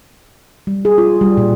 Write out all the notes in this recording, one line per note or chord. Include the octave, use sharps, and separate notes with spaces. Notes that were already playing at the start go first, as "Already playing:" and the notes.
G3
G#4
F4
G3
A#2